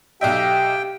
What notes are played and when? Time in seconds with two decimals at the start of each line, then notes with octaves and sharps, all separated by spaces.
0.21 B1 G4 D#5 E5 G5